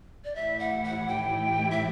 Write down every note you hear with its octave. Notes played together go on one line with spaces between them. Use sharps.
D5
A2 E3 A3 E4 G4 E5
F#5
F#5
G5
E5